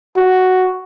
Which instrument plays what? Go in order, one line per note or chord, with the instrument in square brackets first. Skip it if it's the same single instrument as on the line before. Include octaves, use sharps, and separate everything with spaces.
[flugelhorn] F#4